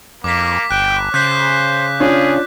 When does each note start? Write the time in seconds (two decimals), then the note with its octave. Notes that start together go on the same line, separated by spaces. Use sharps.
0.24 F2 A#3 D6 B6
0.71 G1 G5 F#6
1.14 C#3 C5 F#6 G6 B6
2.00 C#4 D4 F4 G#4